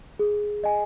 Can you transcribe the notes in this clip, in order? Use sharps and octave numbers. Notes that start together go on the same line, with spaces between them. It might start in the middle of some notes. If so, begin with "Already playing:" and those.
G#4
D#5 G#5